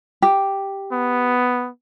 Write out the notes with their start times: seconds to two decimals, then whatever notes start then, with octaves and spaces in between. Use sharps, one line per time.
0.22 G4
0.92 B3